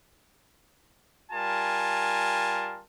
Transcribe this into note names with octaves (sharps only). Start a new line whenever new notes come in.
G3 F4 A#4 G#5 A5